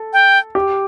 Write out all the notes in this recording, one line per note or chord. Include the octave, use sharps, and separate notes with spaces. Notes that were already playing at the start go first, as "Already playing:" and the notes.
Already playing: A4
G5
G4